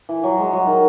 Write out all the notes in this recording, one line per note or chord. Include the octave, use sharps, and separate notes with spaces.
E3
F#3
G#3
F#3
D#3